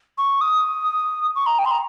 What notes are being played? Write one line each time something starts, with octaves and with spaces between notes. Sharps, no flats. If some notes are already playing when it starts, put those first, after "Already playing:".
C#6
D#6
C#6
A#5
G5
C6
A#5